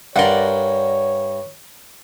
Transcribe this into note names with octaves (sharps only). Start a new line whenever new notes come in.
G2 A#4 C#5 D5 F#5 C6